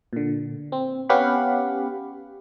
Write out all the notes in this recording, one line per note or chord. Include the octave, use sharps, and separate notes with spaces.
A#2 D3
C4
B3 C#4 G4 F5 F#5 B5